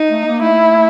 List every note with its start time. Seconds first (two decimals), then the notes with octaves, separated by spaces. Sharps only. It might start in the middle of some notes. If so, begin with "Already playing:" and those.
Already playing: D#4
0.09 A3
0.26 A#3
0.42 A3 E4